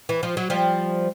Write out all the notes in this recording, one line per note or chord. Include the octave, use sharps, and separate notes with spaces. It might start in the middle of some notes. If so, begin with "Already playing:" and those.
E3
F3
F#3
F3 G3